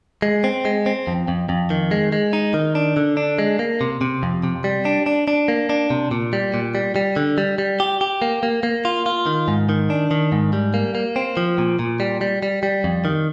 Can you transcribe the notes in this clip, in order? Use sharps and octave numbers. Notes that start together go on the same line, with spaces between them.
G#3
C4
G#3
C4
F2
F2
F2
D#3
G#3
G#3
D#4
D#3
D4
D3
D4
G#3
A#3
C3
C3
F2
C3
G3
D4
D4
D4
A#3
D4
C3
A#2
G3
A#2
G3
G3
D3
G3
G3
G4
G4
A#3
A#3
A#3
F4
F4
D#3
G#2
D#3
D4
D#3
G#2
G3
A#3
A#3
C4
F3
A#2
A#2
G3
G3
G3
G3
F2
D#3